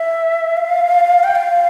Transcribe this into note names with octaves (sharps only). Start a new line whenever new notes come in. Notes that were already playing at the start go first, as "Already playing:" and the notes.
Already playing: E5
F5
G5
F5